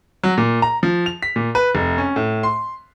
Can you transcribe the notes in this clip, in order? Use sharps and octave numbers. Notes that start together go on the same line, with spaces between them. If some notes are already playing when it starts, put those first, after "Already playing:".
F#3
A#2
A#5
F3
F7
B6
A#2
B4
F1
C#4
A2
C6